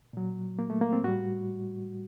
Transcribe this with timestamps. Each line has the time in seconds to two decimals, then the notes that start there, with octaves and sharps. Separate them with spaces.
0.13 A#2 F#3
0.59 A#3
0.70 A3
0.81 A#3
0.93 C4
1.04 A2 G3 F#4